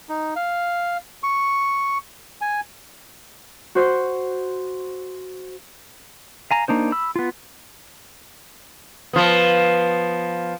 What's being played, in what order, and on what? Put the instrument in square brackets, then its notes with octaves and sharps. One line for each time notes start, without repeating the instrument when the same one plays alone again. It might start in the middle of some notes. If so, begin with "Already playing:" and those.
[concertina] D#4
F5
C#6
G#5
[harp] F#4 C5
[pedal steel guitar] F5 G#5 A#5
A#3 D4 D#4 C5
B5 E6
B3 F4
[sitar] F3 B3